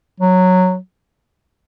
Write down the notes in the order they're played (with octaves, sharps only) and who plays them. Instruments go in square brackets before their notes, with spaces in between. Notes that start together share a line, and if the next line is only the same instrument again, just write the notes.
[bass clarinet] F#3